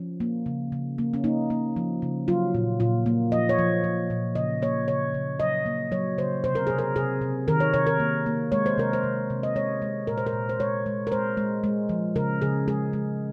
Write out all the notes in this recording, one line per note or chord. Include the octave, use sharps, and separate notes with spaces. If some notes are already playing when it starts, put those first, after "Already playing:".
Already playing: F3 C#4
A#3
C#3
C#3
A#3
C#4
A#3 D#4
A#3
F3
C#3
F#3 F4
A#2
A#2 F4
A#3
F3 D#5
C#5
F3
F3
A#2
C#3 D#5
A#3 C#5
C#3 C#5
C#3
F#3 D#5
A#3
F#3 C#5
C#3 C5
C3 C5
A#4
C3 G#4
A#4
C3 G#4
C3
D#3 A#4
C#5
C3 C#5
A#4
A#3
A#3
G#3 C#5
C5
C3 A#4
C5
C3
C3
D#5
G#3 C#5
G#3
A#2 A#4
C5
A#4
A#2
C5
G#3 C#5
G#3
A#4
G#3 C5
G#3
G#3
F3
C#3 A#4
C#3 G#4
G#3 G#4
G#3